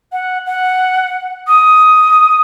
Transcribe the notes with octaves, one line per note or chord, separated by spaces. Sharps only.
F#5
F#5
D#6